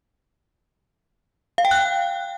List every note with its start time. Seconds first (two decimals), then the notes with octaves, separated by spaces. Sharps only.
1.58 F5
1.65 G5
1.71 F#6